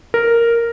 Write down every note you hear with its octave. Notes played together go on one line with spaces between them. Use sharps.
A#4